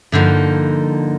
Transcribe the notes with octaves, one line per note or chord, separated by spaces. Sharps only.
G2 D3 F3 A#3 D#4